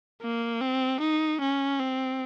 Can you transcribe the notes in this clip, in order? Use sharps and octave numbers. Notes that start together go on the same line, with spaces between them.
A#3
C4
D#4
C#4
C4